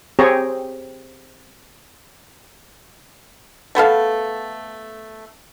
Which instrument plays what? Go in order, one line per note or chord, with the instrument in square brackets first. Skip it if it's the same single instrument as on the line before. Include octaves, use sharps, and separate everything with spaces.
[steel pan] C4 G4 G#4 C#5 A#5
[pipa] A3 B3 A4 F5